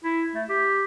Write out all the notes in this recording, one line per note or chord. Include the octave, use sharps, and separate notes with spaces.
E4
A3
G4